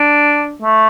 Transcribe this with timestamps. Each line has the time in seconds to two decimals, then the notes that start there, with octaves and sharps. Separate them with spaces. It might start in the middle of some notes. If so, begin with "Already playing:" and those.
Already playing: D4
0.62 A3